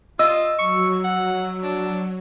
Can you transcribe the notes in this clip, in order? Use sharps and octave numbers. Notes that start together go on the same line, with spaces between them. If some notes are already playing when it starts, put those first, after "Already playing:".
F4 D#5 E6
F#3 C#6
F#5
D4